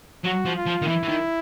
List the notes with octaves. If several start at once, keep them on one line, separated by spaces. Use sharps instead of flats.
F#3 F#4
F3
F4
F3
D#3
E3 E4
E3
D#3